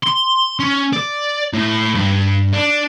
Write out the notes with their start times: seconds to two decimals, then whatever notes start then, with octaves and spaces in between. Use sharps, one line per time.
0.04 C6
0.59 C#4
0.93 D5
1.53 A2
1.95 G2
2.52 D4